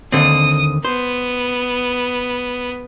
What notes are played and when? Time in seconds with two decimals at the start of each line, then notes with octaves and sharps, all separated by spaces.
0.12 D#2 D3 C4 D#6
0.85 B3 C5